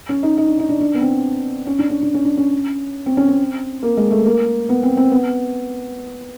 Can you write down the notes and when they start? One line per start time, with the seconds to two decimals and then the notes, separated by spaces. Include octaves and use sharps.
0.09 C#4
0.23 D#4
0.37 D#4
0.47 D4
0.59 D#4
0.69 D4
0.80 D4
0.94 B3
1.01 C4
1.66 C#4
1.79 D4
1.90 C#4
2.02 D4
2.14 C#4
2.25 D4
2.37 C#4
3.06 C4
3.17 C#4
3.28 C4
3.83 A#3
3.97 G#3
4.11 A3
4.25 A#3
4.69 B3
4.83 C4
4.97 C4
5.12 B3